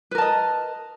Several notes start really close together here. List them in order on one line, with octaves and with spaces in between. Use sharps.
B4 A#4 A5 D#5